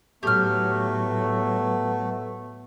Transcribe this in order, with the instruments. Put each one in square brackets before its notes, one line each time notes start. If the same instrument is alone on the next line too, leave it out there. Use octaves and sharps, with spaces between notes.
[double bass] A2 F#3 [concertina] A3 [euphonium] B3 [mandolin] G4 F6